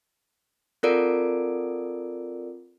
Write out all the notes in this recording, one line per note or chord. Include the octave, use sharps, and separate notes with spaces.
C4 F4 A4 A#4 D5 D7